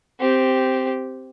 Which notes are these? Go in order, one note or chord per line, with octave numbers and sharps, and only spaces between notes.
C4 G4